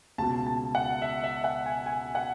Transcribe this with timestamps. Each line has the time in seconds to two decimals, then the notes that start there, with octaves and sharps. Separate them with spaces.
0.18 C#2 B2 A5
0.46 A5
0.75 F#5
1.02 E5
1.24 E5
1.44 F#5
1.66 G#5
1.86 G#5
2.15 F#5